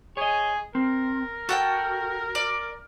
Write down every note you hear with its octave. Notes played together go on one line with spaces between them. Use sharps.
G#4 C#5 D#5
C4 A#4
F#4 A4 F#5 G5
D5